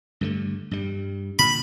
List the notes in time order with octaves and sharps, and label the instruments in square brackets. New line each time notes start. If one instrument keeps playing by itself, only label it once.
[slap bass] G2 D3 A3
G2 G3
[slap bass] A#2 D3 [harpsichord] B5